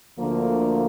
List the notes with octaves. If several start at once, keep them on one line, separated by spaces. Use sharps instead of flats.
D2 D3 F3 A#3